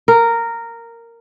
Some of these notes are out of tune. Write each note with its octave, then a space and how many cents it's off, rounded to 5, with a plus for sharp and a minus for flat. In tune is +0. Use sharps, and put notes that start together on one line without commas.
A#4 -10